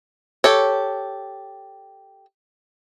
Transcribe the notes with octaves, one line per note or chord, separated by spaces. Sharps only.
G4 A4 C#5